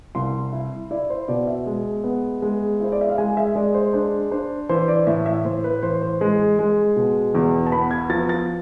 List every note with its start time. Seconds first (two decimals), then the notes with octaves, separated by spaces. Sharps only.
0.15 C2 C6
0.52 E4
0.91 E4 D5
1.10 C5
1.28 B2 D5
1.47 E5
1.66 G#3
2.04 B3
2.42 G#3
2.80 E4 C5
2.92 D5
3.01 E5
3.09 F5
3.18 G#3 G#5
3.37 E5
3.55 G#3 D5
3.74 C5
3.94 D4 C5
4.31 D4 C5
4.69 E3 C5
4.88 D5
5.07 A2 E5
5.26 E5
5.45 A2 C5
5.64 B4
5.83 E3 C5
6.02 C5
6.21 G#3
6.59 G#3
6.96 B2
7.35 E2
7.67 A5
7.72 B3 B5
7.91 G#6
8.10 F3 A6
8.29 A6